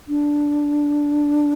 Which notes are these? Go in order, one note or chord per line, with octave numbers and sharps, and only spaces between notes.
D4